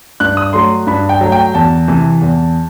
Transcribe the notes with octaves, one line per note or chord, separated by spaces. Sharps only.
G2 F#6
D#6
F#3 A3 C6
G2 B5
G5
F#3 A3
G5
E2 A5
C3 E3
E2